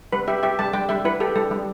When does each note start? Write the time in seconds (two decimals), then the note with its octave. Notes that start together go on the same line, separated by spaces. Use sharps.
0.12 G3 B4
0.28 G4 E5
0.43 G4 E5
0.59 G3 A5
0.73 G3 G5
0.89 G3 E5
1.05 E4 B4
1.20 G4 A4
1.36 G3 A4
1.51 G3